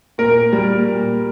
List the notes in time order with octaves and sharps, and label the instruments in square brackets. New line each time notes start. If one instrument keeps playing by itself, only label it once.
[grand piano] A#2 A#4
G3 A#3
A#2